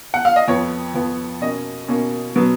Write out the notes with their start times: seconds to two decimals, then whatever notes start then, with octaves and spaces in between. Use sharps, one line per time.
0.14 F#5
0.25 F5
0.36 D#5
0.48 F2 F3 B3 C#5
0.94 F2 F3 B3
1.41 B2 A#3 C#4 D#5
1.88 B2 A#3 C#4
2.36 B2 F#3 B3